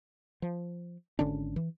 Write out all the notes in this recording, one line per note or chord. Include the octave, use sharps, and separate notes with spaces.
F3
G#1 D3 C#4 D4
E3